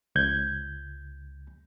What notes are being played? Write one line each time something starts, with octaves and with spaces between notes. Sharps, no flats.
C#2 G6 G#6